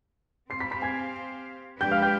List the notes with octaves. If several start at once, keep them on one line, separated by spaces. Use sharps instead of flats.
C4 G4 C5 F5 C6 C7
B5 B6
B5 B6
G#5 G#6
F3 G#3 D4 G4 B4 G5 G6
F5 F6
G5 G6